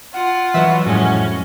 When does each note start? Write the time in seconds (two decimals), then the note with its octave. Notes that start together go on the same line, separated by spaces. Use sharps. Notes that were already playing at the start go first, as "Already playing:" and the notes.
0.14 F4 F#5
0.54 E3 F#3 B4 D#5 E5
0.86 F2 A2 G#3 C#4 F#4